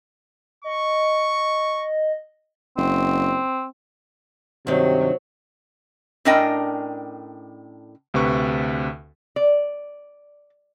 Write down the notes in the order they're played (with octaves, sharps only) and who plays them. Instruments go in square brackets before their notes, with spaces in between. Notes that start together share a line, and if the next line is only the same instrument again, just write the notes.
[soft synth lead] D#5 [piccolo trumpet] C#6
[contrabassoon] F#1 [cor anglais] C4
[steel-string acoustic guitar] G2 D#3 [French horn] C3 [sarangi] F#3 [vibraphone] C5
[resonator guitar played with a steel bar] A2 C#4 D4 A#4 D#5 G5
[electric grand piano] D2 C3 B4 C#6
[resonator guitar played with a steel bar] D5